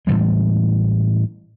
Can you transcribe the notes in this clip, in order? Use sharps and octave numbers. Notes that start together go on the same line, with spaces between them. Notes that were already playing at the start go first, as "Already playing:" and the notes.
A2 E3 G3 G#3